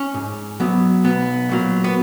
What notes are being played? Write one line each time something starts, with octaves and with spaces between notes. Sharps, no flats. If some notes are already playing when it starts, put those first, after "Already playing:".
Already playing: C#4
G#2
F#3 B3
B1 B3
A#2 F#3 A#3
B3